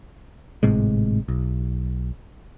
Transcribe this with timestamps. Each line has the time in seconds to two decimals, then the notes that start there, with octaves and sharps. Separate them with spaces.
0.63 G#1 A2 C3 G#3
1.28 B1